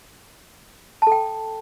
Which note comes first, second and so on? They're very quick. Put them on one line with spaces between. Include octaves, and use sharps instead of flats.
A5 A4 G5